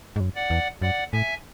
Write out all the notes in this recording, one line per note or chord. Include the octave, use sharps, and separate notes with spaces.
G#2
F#2
D5 F#5
E2
F#2 D5 F#5
A2 E5 G#5